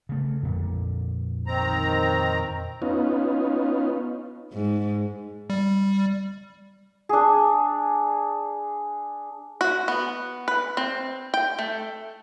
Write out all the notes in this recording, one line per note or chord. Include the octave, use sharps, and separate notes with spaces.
C#3 A3
F2 A#2 D3
D#3 C4 A#5
B3 C#4 D#4 F4
G#2
G3
D4 G#4
F#4
B3
B4
C4
G5
A3